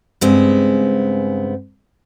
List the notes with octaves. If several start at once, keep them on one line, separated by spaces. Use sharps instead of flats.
G2 C#3 G#3 B3 C4